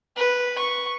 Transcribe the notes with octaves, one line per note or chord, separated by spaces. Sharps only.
B4
C#6